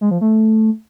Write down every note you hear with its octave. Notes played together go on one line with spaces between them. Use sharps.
G#3
F3
A3